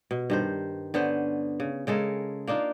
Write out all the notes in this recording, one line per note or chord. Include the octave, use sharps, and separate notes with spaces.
B2
G2 D#3 C5
D3 B3 C#4 C5
C#3
C#3 G#3 A4 A#4
A#3 D4 D#4 F4